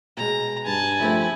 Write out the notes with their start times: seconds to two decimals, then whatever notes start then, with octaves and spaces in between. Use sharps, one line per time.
0.17 B2 G#3 A#5
0.66 G2 G#5 A5 B5
1.00 F3 A3 C4 E4